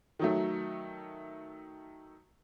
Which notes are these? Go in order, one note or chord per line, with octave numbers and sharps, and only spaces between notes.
D#3 F#3 A3